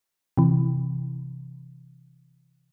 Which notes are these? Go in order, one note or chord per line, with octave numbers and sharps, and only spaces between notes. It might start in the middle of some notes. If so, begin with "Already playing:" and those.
C3 E3